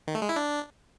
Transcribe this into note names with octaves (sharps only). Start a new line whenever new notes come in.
D#3
A3
G#3
E4
D4